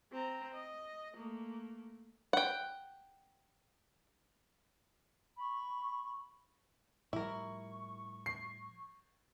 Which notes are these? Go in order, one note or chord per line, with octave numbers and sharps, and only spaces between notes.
C4 A#5
D#5
A3 A#3
F#5 G5
B5 C#6
A2 F3 G3 E4 A#4 C#6
C7